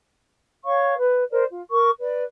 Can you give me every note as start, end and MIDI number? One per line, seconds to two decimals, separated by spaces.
0.64 0.95 73
0.64 0.95 77
0.64 0.95 85
0.98 1.23 71
1.31 1.43 70
1.31 1.43 72
1.31 1.43 74
1.49 1.63 65
1.71 1.91 70
1.71 1.91 85
1.99 2.23 71
1.99 2.23 74